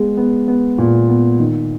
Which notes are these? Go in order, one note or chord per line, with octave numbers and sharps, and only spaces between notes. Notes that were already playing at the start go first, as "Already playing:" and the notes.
Already playing: G#3 B3
B3
B3
A#2
B3
D#3